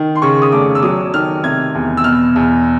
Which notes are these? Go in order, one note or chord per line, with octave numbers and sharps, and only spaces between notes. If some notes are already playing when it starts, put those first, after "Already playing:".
Already playing: D#3
C6
C#3 C#6
D#6
F1 D6
E6
F#3 D#6
D#3 F6
C3 G#6
E2
E6
B2 F6
E2